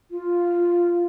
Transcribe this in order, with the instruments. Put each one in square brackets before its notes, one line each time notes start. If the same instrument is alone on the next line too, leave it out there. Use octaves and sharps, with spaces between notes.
[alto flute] F4